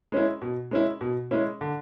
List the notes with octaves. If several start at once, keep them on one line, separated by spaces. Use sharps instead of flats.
G#3 C#4 E4
B2
G#3 C#4 E4
B2
G#3 C#4 E4
D3